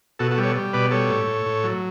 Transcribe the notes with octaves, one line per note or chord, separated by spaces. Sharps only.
B2 F#4 A4
F#4 A4
G3
A4 C#5
G3
B2 B4 D5
G3 A4 C#5
A2
A2
A2
F#3